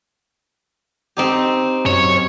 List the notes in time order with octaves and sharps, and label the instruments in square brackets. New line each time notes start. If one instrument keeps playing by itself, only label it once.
[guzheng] C4 D#4 G4
[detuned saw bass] F#2 [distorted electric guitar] C#5